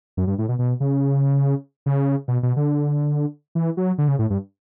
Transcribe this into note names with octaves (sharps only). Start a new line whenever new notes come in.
F#2
G2
A2
B2
B2
C#3
C#3
B2
B2
D3
E3
F#3
D3
C#3
A2
G2